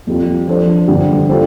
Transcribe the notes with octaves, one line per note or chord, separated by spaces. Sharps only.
F2 C3 G3 F4
F3 D4 A4 C5
G2 D3 G3
G3 F4 A4 C5